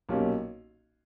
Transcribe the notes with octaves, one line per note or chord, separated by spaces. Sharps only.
B1 A#2 A#3 C#4 G4